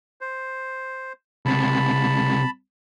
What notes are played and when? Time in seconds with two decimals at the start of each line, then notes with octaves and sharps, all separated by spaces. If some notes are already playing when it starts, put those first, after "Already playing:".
0.21 C5
1.46 C#2 C3 A5 B5